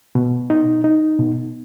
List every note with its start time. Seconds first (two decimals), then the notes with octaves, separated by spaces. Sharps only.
0.15 B2
0.50 D#4
0.84 D#4
1.19 B2